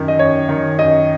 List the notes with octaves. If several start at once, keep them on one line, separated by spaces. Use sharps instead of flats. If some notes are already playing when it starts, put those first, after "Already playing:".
Already playing: F#2 D#3
D#5
F#2 C#5
D#3
F#2 D#5